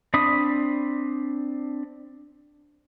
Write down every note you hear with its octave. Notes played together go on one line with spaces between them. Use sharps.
C4 D4 B5 D#6